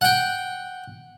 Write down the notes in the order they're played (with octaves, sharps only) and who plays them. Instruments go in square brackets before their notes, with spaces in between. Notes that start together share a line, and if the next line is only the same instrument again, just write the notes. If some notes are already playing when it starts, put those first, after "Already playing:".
[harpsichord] F#5 G5